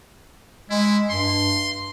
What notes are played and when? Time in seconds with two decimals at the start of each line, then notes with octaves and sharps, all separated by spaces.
0.70 G#3 E4
1.10 G2 C6